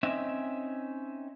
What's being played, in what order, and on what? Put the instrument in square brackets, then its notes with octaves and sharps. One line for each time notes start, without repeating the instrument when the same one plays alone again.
[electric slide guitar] C4 C#4 D#4 E5